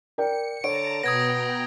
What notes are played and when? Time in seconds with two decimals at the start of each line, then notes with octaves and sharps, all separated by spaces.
0.18 A#4 D5 G5 C#7
0.64 D3 C#5 A5 A#5 D7
1.03 B2 B3 G5 A#5 D#6 G#6 A#6